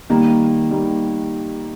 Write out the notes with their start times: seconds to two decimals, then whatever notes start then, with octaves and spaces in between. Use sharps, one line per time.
0.10 D#3 G3 A#3
0.70 D#3 G3 A#3